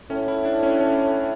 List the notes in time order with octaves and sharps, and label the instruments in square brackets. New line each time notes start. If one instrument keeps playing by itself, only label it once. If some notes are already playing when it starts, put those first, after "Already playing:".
[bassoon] A2 [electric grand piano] C#4
[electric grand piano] E4
D4
C#4
C#4